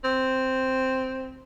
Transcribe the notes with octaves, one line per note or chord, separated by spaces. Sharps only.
C4